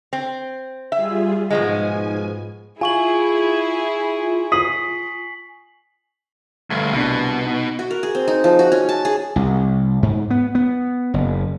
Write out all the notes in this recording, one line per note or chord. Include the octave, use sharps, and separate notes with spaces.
C4
G3 F4 G#4 E5
G#2 B2 F3 G#3 G#5
E4 F4 G#4 G#5 C#6 F#7
D#6 B6 C7 F#7
D2 G2 A3
C2 B2 D4
D#4
F#4
A#4
G#4
C4
D#4
F3
F#4
C#4
A5
G#4
C2
G#2
B3
B3
F#1